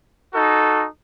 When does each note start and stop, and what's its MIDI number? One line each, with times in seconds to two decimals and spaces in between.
0.34 0.87 63
0.34 0.87 66
0.34 0.87 69